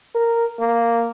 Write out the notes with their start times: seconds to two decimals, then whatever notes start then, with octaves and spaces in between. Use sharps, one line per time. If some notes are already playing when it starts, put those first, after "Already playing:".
0.15 A#4
0.60 A#3